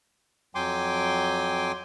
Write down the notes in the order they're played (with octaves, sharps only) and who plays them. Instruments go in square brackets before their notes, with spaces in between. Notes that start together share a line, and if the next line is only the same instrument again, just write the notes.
[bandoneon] F2 F#3 G5 G#5 C6 D6